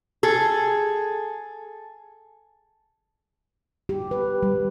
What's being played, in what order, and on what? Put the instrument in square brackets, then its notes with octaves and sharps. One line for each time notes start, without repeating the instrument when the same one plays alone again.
[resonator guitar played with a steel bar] G#4 A4
[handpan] G4
B4
G3